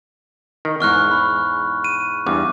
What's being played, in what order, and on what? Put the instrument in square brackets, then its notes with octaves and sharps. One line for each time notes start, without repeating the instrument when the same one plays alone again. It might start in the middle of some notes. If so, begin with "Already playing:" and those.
[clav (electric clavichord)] D#3
[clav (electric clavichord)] E2 G#2 [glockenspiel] C#6 F6 F#6
[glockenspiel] B5
D#7
[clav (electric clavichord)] E2 G2 [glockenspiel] D6